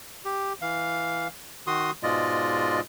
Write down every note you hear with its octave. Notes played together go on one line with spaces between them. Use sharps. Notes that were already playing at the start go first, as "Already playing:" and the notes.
G4
E3 F5
D#3 F#4 C6 D#6
G#2 B2 G#3 F4 D5 D#5